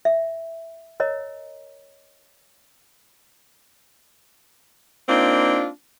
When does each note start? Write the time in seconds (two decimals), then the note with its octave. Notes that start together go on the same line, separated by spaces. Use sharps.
0.05 E5
1.00 A#4 C#5 D#5 A#5
5.09 A#3 C4 D4 D#4 F4